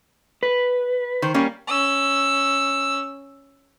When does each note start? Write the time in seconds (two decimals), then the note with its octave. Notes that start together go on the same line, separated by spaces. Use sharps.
0.43 B4
1.22 D#3 C5
1.34 G3 A#3 C#4
1.68 C#4 E6